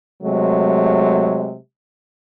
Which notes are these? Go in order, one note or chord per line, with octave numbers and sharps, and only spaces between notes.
C3 F#3 G#3 A3